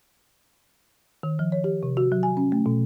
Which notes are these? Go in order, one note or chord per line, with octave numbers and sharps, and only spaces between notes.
D#3
F3
C#5
G4
C3
F#4
F#3
G#5
C#4
A3
B2